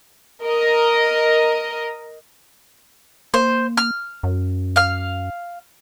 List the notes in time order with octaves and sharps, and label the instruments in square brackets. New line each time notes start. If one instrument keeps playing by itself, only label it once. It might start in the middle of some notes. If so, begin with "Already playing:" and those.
[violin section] A#4 D#5
[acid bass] A#3 [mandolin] C5
[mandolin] F6
[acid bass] F#2
[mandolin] F5 F6